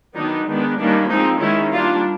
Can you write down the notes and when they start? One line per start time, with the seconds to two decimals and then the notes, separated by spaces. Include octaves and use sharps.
0.14 D#3 F#3 B3 D4 D#4
0.47 D#3 G#3 B3 D4
0.77 D#3 G3 A#3 C#4 D4
1.09 F3 G#3 C4 D#4
1.40 D#3 G#3 C#4 E4
1.73 G3 A#3 D4 F4